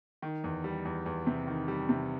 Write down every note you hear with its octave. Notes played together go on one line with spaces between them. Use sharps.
D#3
E2
G3
E2
E2
C3
D#3
G3
C3